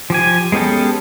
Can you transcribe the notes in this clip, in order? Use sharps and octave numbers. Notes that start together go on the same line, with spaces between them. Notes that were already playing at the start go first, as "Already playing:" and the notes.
F3 G4 G#5
G#3 B3 C#4 G4 A4